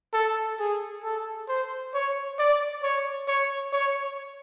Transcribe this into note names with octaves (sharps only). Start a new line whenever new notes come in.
A4
G#4
A4
C5
C#5
D5
C#5
C#5
C#5